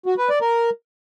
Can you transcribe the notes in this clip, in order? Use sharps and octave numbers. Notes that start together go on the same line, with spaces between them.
F#4
B4
D5
A#4